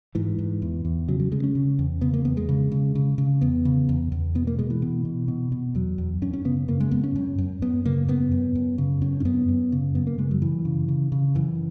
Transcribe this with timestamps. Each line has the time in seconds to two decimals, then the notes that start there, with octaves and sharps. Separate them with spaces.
0.15 G#2 E3
0.38 G#2
0.62 E2
0.85 E2
1.08 C#3 F#3
1.20 F#3
1.32 C#3 G#3
1.44 C#4
1.55 C#3
1.79 E2
2.01 C#3 B3
2.14 A#3
2.25 E2 B3
2.37 G#3
2.49 C#3
2.72 C#3
2.95 C#3
3.18 C#3
3.41 E2 B3
3.65 C#3
3.89 E2
4.12 E2
4.35 B2 B3
4.47 A#3
4.59 B2 G#3
4.70 E3
4.82 B2
5.05 B2
5.28 B2
5.52 B2
5.75 E2 F#3
5.98 E2
6.22 F#2 C#4
6.33 C#4
6.45 C#3 B3
6.68 C#3 A#3
6.80 G#3
6.91 F#2 B3
7.04 C#4
7.16 F#2
7.38 F#2
7.62 F#2 B3
7.85 C#3 A#3
8.08 F#2 B3
8.32 F#2
8.55 F#2
8.78 C#3
9.02 F#2 C#4
9.20 C#4
9.25 F#2 B3
9.48 F#2
9.72 C#3
9.95 F#2 B3
10.07 A#3
10.18 C#3 G#3
10.31 F#3
10.41 F#2 E3
10.65 C#3
10.88 C#3
11.12 C#3
11.35 F#2 E3